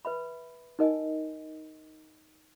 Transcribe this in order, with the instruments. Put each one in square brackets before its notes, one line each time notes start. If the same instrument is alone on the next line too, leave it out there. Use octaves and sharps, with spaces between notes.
[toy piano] B4 E5 B5
D#4 A#4 D#5 G#5